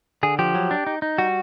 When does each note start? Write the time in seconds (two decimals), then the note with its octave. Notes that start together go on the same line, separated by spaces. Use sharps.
0.23 D3 G#4
0.39 F3 G4
0.55 F#3
0.71 D4
0.87 D#4
1.02 D#4
1.18 G3 F#4